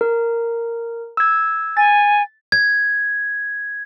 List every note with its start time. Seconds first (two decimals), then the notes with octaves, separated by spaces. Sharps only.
0.01 A#4
1.17 E6 G#6
1.77 G#5 A6
2.52 G#6